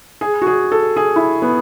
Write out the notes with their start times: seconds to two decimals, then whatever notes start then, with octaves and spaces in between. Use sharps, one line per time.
0.21 G#4
0.42 F#4
0.47 G#4
0.72 A4
0.96 G#4
1.16 E4
1.42 B3